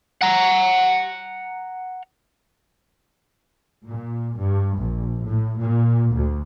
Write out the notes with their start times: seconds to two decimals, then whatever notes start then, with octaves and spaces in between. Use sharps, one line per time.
0.21 F#5 A#5
3.89 A#2
4.38 G2
4.78 A#1
5.24 A2
5.59 A#2
6.13 D2